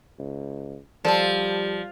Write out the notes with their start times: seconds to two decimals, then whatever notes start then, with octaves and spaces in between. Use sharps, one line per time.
0.19 C#2
1.05 F3 G3 A4 D5 A5